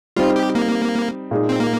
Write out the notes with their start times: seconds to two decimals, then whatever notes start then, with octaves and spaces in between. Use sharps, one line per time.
0.16 G3 C4 D#4 F4
0.36 G4
0.55 A#3
1.31 A#2 G#3 D#4 G#4
1.49 C4
1.60 A#3